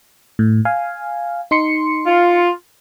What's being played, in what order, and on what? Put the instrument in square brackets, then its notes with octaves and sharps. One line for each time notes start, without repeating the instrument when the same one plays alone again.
[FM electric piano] A2
F5 G#5
D#4 C6 C#7
[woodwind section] F4